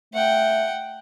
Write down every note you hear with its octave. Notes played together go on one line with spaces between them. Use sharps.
A3 F#5 G5